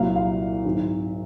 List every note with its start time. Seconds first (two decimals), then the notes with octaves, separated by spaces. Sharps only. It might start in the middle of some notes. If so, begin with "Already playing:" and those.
Already playing: C2 A#2 F#3 F5
0.16 F5
0.65 G#1 G#2 F#3